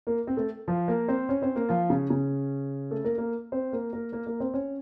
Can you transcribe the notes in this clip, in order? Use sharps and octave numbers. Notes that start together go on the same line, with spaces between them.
A#3 A#4
C4 C5
A3 A4
F3 F4
A#3 A#4
C4 C5
C#4 C#5
C4 C5
A#3 A#4
F3 F4
C#3 C#4
C#3 C#4
A3 A4
A#3 A#4
A#3 A#4
C4 C5
A#3 A#4
A#3 A#4
A#3 A#4
A#3 A#4
C4 C5
C#4 C#5